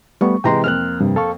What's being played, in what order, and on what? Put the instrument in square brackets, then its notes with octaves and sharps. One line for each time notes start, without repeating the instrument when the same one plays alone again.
[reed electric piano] G3 A3 B3 [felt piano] C#6
[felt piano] C3 E3 G#3 [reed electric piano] G5 A#5 C6
[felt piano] F2 A#3 C4 [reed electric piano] F6 F#6
[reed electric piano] G2 C3
A4 F5 C#6